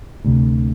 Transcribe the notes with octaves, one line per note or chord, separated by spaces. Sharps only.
D2 C3